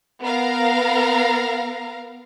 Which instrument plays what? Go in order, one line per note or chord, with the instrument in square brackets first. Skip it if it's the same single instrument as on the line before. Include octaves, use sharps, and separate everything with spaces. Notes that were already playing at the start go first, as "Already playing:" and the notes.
[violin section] B3 A#4 F5 A#5